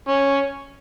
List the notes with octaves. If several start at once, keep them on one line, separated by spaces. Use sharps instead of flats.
C#4